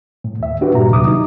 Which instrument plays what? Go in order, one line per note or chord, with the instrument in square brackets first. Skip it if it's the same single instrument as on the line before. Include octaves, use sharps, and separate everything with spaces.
[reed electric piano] A2
D#2 E5
D4 F#4 G4 B4
G2 A#2 A#5
D#2 C3 F#3 D6 D#6
D#4